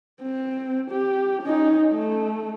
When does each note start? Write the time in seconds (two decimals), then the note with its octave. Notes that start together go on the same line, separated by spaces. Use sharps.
0.22 C4
0.90 G4
1.42 C#4 D#4
1.93 A3